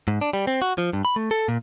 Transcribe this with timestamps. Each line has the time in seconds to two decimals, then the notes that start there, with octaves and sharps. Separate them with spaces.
0.08 G#2
0.21 D4
0.33 G3
0.47 C4
0.62 F#4
0.78 F3
0.93 G2
1.05 B5
1.16 A3
1.31 A4
1.48 A#2